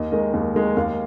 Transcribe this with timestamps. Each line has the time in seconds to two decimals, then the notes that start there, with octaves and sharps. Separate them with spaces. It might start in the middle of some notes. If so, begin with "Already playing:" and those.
Already playing: D#2 D#5
0.11 D#3 G#3 D#5
0.34 D#2
0.54 D#3 G#3
0.77 D#2 F5